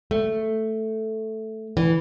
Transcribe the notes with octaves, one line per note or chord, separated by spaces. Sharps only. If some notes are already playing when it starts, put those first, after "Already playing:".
A3
E3